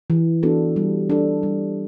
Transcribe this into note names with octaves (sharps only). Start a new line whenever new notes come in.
E3
B3 D4 F#4 A4
G3
D4 A4
G3